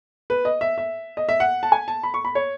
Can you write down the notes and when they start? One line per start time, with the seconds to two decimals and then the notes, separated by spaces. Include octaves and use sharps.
0.30 B4
0.45 D#5
0.61 E5
0.78 E5
1.17 D#5
1.29 E5
1.40 F#5
1.63 A5
1.72 G#5
1.88 A5
2.04 B5
2.14 C#6
2.25 B5
2.35 C#5